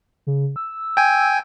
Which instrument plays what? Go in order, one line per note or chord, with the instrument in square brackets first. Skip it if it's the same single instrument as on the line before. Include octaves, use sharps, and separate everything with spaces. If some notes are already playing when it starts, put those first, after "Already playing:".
[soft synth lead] C#3
E6
[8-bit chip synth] G5 G#5